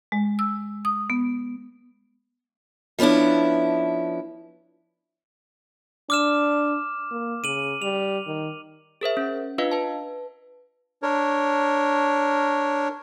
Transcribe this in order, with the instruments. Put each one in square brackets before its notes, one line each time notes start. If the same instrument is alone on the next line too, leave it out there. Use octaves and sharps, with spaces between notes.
[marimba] G#3
E6
D#6
B3
[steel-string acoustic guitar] F3 B3 C#4 D4 E4
[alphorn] D4 [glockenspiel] D6 F6 E7
[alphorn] A#3
[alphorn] C#3 [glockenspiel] D#7 F#7
[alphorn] G3 [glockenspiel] F7
[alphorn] D#3
[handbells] G#4 A#4 C5 E5
C#4
D4 F4 B4 D#5 F5
B4 A5
[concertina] D4 A#4 C#5